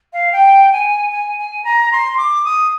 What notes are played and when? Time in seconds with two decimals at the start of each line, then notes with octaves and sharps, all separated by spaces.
0.13 F5
0.32 G5
0.73 G#5
1.12 G#5
1.39 G#5
1.64 A#5
1.92 C6
2.17 D6
2.45 D#6